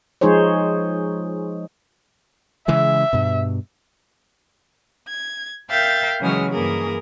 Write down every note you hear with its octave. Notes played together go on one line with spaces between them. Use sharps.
F3 G#3 D#4 G#4 C5 C#5
C#3 E3 G#3 E5
G2 B2
G#6
A#4 E5 F5 G5 G6 A6
C#3 E3 F#3 G#3 D#6 F6
G2 E3 A#3 G#4 A#4